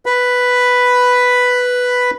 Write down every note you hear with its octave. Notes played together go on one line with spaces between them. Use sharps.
B4 B5